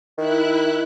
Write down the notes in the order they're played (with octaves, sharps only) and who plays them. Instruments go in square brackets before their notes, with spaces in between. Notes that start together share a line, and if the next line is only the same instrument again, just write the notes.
[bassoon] D#3 [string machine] E4 F#6